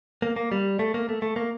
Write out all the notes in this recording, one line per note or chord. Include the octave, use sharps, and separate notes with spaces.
A#3
A#3
G3
A3
A#3
A3
A3
A#3